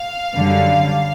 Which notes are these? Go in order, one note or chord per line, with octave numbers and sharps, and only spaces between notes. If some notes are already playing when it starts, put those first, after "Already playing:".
Already playing: F5
F#2 D3 G3